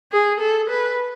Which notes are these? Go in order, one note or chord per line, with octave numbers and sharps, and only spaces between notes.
G#4
A4
B4